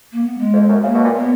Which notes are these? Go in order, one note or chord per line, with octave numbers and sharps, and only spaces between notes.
A#3
B3
G#3
F2
F#2
C#3 A#3
B2
A#2
B3